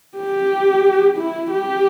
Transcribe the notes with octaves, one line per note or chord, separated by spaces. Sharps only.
G4
E4
G4